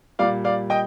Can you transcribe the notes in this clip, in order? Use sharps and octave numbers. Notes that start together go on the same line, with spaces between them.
A#2 G3 D5 F5
D5 F5
D#5 G5